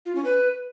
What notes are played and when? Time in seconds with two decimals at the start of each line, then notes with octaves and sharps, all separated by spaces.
0.06 F4
0.15 C#4
0.25 B4